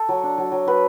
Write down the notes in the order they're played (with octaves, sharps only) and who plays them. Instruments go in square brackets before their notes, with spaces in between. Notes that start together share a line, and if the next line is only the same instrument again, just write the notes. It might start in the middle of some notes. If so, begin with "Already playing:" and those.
Already playing: [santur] A4
F#3
D4
F#3
F#3
F#3 B4